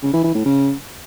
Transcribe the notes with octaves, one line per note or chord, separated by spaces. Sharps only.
C#3
E3
E3
A2
C#3